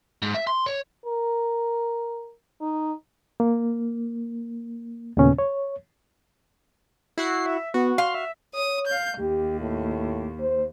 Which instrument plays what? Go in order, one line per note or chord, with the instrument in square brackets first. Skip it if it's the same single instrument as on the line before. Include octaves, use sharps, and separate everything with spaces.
[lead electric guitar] G#2
E5
C6
C#5
[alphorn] A#4
D#4
[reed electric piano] A#3
D#2 A#2 C#3 B3 C#4
C#5
[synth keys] E4 F#4 F#5 [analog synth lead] C7
[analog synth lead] E5
[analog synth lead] B3 [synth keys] F#4
[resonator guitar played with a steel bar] F5 [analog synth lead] C6
[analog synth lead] E5
[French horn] C#5 [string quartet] D#6
[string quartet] F5 G6
[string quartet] D#2 [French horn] G4
[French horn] A2
C5